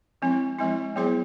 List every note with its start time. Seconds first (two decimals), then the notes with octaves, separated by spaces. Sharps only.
0.22 F3 G#3 C4 E4
0.58 F3 G#3 C4 E4
0.96 F#3 B3 E4 G#4 C5